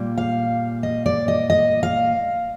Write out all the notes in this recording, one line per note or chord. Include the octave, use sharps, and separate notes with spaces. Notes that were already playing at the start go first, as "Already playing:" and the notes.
Already playing: A#2 G3 A#3
F5
D#5
D5
D#5
D#5
F5